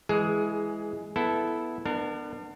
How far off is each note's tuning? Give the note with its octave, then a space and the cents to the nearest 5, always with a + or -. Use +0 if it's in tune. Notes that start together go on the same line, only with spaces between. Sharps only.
E3 +0 G#3 +0 G#4 +15
B3 +0 E4 +0 A4 -10
B3 +0 D4 +30 A#4 -25